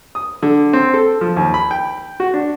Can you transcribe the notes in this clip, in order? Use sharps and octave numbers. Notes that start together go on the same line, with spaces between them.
D#6
D3
C4
A4
F3
D#2
B5
G5
F#4
D4